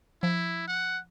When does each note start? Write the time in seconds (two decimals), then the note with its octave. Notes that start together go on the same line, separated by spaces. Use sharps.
0.23 F3 E4
0.68 F#5